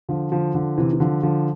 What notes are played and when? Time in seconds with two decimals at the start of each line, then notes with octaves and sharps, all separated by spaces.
0.09 D3 F3
0.32 D3 F3
0.54 D3 F3
0.78 C3 E3
0.93 E3
1.00 D3 F3
1.23 D3 F3